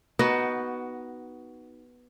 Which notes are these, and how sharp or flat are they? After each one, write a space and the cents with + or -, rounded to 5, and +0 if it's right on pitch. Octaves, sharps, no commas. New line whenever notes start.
B3 -5 D#4 +0 F#4 +15